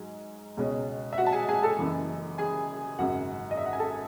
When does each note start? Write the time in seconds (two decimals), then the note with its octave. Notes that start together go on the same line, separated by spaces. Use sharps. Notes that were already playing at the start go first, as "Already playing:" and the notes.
Already playing: G#2 F#3 G#5
0.57 C#2 B2 G#3 C#4
1.13 E5
1.18 F#4 F#5
1.26 A5
1.32 G#4 G#5
1.49 G#4 G#5
1.63 A4 A5
1.79 F#1 F#2 E3
2.38 G#4 G#5
2.99 G#1 F#2 C#3 F#4 F#5
3.51 D#5
3.57 E5
3.66 F#5
3.73 G#5
3.79 A4 A5